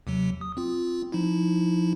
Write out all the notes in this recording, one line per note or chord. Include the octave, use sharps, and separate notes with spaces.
D#2 C3 F#3
D#6
C4 F4
F3 D#4 E4